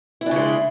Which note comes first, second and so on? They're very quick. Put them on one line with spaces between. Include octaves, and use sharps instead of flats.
E4 D4 C#3 G#3